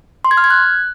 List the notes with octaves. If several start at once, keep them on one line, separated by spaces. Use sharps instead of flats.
C6
G#6
F6
G#6
F#6